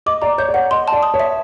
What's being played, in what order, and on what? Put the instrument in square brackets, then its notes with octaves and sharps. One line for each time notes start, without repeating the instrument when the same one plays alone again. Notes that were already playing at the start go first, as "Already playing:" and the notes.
[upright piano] D#5 [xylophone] D6
[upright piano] D5 [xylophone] A#5
[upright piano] C#5 [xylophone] G6
[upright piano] D5
[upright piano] C#5 [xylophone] F#5
[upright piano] D#5 [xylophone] C6
[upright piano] D5 [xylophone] A5
[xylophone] D#6
[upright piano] C#5
[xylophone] E5